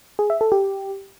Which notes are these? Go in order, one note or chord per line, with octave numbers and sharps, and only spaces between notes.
G#4
E5
A4
G4